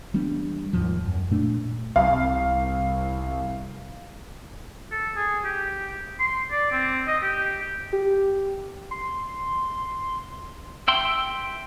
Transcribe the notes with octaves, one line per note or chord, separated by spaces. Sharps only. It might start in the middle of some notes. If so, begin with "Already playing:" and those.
E3 G3 B3 D4
D#2 G#2 F3
F#2
A#2 A3 D4
C2 F5
A4
G#4
G4
C6
D5
C4
D#5
G4
G4
C6
E5 G5 C6